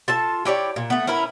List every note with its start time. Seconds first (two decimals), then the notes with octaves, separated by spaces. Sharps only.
0.08 F4 A4 A5
0.45 E4 G4 C#5 D5
0.76 A#2
0.90 A3 B3
1.07 C#4 E4 A#4 B4